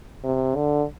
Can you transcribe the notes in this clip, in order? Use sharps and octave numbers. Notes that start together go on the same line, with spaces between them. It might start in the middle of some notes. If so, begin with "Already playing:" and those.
C3
D3